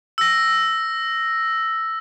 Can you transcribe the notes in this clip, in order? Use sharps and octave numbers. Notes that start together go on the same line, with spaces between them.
E6 A#6